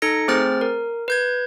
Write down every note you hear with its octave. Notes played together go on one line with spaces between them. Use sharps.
D#4 A4 A#6 C#7
A3 C4 G#4 C5 F6 A6
A#4
B4 G6 G#6